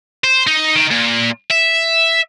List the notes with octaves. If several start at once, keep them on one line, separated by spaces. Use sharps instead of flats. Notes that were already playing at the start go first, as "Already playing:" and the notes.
C5
D#4
D#3
A#2
E5